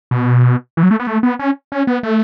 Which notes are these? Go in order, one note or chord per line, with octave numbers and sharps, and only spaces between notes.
B2
E3
F#3
A3
B3
A3
B3
C#4
C#4
B3
A3